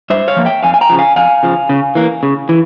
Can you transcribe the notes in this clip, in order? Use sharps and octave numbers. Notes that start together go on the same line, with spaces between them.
G2 C5 E5
C#5 F5
F3 A#3
E5 G5
F2 F5 G#5
G#5
G5 A#5
C#3 F3
F5 G#5
F2 F5 G#5
C#3 F3
C#3
E3 A#3
C#3
E3